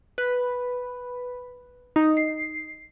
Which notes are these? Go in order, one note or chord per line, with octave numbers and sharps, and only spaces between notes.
B4
D#4
C7